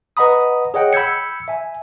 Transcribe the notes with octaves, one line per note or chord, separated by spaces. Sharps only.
B4 D#5 F#5 A#5 B5 D#6
G#4 C#5 D#5 F#5 G5
B5 E6 G6 G#6 C#7
E5 G#5